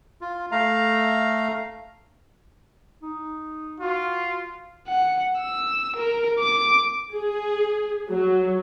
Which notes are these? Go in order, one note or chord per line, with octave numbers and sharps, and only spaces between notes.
F4
A3 F5 A#5
D#4
F4 F#4
F#5
E6
A#4
D6
G#4
F#3